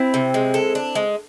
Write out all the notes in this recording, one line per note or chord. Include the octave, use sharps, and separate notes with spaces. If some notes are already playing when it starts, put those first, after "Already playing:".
Already playing: C4 E4
C3
G#3
A4
D4
G#3